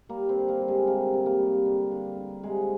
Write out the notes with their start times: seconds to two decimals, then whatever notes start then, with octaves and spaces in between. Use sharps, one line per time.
0.09 G3 A#3
0.29 C4
0.36 D3
0.49 A#3
0.61 G3
0.68 G#3
0.87 C3 A#3
1.14 C3
1.26 A#3
1.39 G3
1.66 D3
1.91 D3
2.17 D3
2.43 C3 G#3